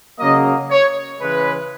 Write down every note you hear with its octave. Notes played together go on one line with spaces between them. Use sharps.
C#3 F#3 A#3 D#5
C#5
C#3 E3 G#3 B4